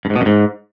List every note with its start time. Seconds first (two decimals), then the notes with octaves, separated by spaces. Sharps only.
0.05 G2
0.10 G#2
0.16 B2
0.21 F#2
0.26 G#2